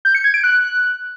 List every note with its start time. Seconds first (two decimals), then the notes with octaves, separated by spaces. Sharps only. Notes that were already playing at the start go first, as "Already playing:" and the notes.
0.05 G6
0.15 C#7
0.24 G#6
0.34 D7
0.44 F#6